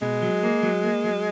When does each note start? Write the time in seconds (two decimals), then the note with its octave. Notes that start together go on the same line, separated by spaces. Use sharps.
0.02 B2 G#3
0.22 F#3
0.43 A#3
0.63 F#3
0.84 A#3
1.04 F#3